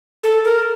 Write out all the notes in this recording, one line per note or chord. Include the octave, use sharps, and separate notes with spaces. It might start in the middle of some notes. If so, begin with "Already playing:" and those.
A4
A#4